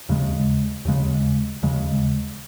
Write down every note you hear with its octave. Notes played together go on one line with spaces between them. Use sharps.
D#2 C#3 G#3
D#2 C#3 G#3
D#2 C#3 G#3